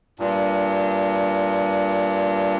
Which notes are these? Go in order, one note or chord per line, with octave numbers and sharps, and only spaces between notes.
G2 A#2